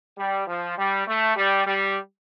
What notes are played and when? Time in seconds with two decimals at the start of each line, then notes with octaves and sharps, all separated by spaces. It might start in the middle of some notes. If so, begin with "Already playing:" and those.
0.18 G3
0.47 F3
0.77 G3
1.07 A3
1.37 G3
1.67 G3